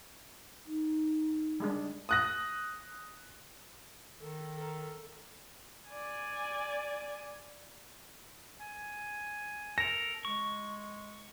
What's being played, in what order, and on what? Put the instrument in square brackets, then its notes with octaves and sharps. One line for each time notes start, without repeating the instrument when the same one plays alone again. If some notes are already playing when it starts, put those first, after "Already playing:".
[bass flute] D#4
[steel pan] G3 G#3 D4
[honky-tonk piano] D#6 F#6 A#6
[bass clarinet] D#3 [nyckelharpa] A4
[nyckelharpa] A4 A#4
[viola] D5 G#5
[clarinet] G#5
[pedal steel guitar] A4 A#4 [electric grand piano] A#6
[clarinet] G#3 [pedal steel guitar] C#6